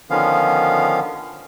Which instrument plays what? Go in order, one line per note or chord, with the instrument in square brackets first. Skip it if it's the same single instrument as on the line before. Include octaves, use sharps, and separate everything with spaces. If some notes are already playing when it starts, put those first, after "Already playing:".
[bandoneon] D3 D#3 F3 B3 C#4 F5